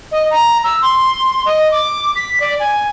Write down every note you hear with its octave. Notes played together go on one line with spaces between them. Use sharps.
D#5
A#5
E6
C6
D#5
D6
B6
D5
G#5